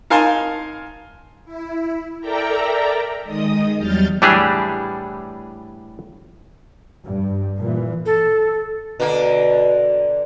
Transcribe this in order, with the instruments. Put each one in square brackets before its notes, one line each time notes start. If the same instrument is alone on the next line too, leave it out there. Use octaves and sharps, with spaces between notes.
[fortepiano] D#4 A#4 F5 G#5 A5 C6
[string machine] E4
A4 A#4 D5 E5 G5 A#5
D#3 G#3 D#5 D#6
E2 F#3 G3 F6 G6 A6
[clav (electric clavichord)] A2 E3 G3 D4 G4 G#4
[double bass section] G2
A#2 E3
[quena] A4
[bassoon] B2 [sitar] D3 A#3